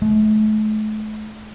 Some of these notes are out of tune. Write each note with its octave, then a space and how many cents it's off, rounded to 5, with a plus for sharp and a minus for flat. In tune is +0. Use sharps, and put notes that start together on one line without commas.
A3 -40